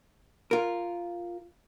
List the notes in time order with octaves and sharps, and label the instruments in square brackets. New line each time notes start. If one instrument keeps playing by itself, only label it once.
[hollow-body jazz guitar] F4 A#4